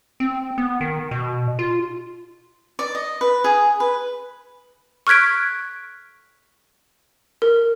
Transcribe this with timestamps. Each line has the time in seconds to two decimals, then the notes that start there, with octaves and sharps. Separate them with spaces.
0.20 C4
0.58 B3
0.81 D#3
1.11 B2
1.59 F4
2.79 D5
2.95 D#5
3.21 B4
3.44 G#4
3.80 B4
5.07 C#6 F6 F#6 G#6 B6 D7
7.42 A#4